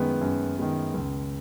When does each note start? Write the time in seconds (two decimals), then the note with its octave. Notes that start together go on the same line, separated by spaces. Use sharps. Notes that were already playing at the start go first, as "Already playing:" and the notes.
Already playing: F#2 D#3 G#3 B3
0.21 F#2
0.57 D#3 G#3 B3
0.94 C#2